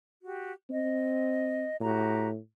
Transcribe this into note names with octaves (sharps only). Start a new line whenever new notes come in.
F#4 G4
C4 D#5
A2 F#4 G4 A#5